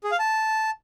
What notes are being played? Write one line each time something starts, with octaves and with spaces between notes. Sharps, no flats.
G#4
F5
A5